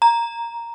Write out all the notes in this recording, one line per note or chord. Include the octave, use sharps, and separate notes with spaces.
A#5